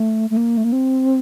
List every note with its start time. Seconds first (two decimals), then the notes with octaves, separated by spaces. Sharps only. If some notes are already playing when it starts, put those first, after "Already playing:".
Already playing: A3
0.30 A3
0.37 A#3
0.57 A3
0.64 A#3
0.73 C4